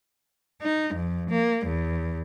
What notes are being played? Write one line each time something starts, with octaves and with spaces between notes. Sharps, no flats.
D#4
F2
A#3
E2